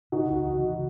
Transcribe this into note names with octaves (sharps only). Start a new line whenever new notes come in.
C#3 D#4 F#4
C#2
E3
C#3